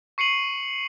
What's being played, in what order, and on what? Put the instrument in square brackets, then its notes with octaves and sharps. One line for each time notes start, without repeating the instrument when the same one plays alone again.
[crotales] C#6 C7 C#7 D#7 F#7